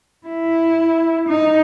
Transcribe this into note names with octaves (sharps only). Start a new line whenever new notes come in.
E4
D#4